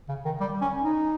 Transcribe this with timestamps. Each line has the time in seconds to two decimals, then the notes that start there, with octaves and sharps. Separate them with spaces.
0.08 C#3
0.25 D#3
0.40 G3
0.61 C#4
0.81 D#4